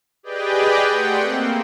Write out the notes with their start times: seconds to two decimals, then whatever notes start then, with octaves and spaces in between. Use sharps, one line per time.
0.23 G4 G#4 B4 D5 D#5 G5
0.90 A3 F#5 G5 C6
1.21 A#3 C4